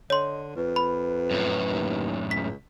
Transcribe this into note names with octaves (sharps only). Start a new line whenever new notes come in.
D3 C#5 D#5 C6
F2 B4
B5
F#2 A2
D#2
C#2 B6